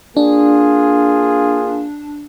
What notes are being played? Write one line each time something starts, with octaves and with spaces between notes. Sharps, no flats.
A#3 D4 F4 G#4